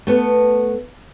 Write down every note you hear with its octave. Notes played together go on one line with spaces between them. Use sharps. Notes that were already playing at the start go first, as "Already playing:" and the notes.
A3 B3